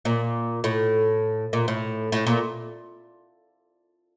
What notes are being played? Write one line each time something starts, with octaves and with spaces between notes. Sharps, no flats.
A#2
A2
A#2
A2
A2
A#2